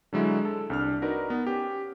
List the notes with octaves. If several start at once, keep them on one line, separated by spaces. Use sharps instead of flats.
D3 F#3 G#3 E4
A4
C2 D4 F6
D#4 F#4 A#4 B4 D5
B3
C#4 G4